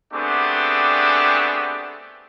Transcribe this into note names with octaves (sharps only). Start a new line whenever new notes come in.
A3 B3 C4 D4 G4 G#4